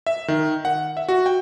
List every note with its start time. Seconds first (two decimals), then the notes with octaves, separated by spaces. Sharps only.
0.07 E5
0.28 D#3
0.65 F#5
0.97 E5
1.08 F#4
1.26 G5